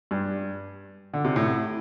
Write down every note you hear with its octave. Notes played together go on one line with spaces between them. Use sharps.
G2
D3
C3
A2